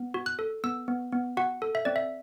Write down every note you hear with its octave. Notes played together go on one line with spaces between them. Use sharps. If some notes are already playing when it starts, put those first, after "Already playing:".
Already playing: B3
F#4
F#6
A4
B3 E6
B3
B3
F#4 F#5
A4
E5
C4 D5
E5